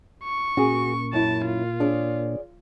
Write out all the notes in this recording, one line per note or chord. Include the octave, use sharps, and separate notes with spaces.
C#6
A#2 C#4 F#4 G#4
F#2 E4 A5
F4
D4 G#4 C#5 D5